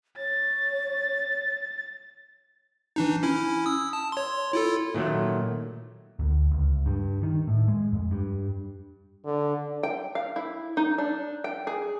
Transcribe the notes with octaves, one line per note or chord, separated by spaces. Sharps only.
C#5 A6
E3 D4 D#4
C#4 E4
D#6 E6
A5
C#5 C6
E4 F4 A4
A#2 D#3 F#3 A3
D2
C#2
G2
D#3
A2
G#3
F2
G2
D3
G5
F5
E4
D#4
D4
G5
G#4